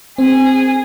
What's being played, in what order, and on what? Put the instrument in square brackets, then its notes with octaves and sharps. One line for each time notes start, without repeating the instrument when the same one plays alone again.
[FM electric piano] C4 [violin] G#4